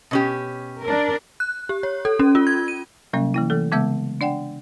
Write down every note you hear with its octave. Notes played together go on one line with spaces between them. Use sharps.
B2 C#4 G4
D4 A#4
F#6
G4
C#5
A4
C#4
F4
G#6
D#7
C3 F#3 G3 A#3 C#4
E3 A#3 E4
E3 A3 A4
C#3 G#3 B3 E5 E6 G6
D4 D5 F#5 G5